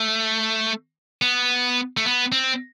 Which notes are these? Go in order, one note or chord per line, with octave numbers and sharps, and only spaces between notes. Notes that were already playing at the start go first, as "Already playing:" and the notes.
Already playing: A3
B3
A3
B3
C4